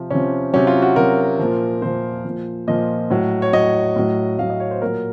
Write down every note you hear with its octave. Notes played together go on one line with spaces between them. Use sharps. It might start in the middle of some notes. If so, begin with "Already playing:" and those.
Already playing: C3 F3
C3 F3 C#4
C3 F#3 C#4
F4
F#4
C3 F#3 A#4
A#2 F3
A#2 F3 C5
A#2 F3
A#2 F3 D#5
A2 F#3
C#5
A2 F#3 D#5
A2 F#3
A2 F#3 F5
D#5
C#5
C5
A#2 F#3 A#4